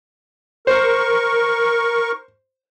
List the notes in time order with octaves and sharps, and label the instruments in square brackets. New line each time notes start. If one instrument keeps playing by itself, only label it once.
[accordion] A#4 C#6 [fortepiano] C5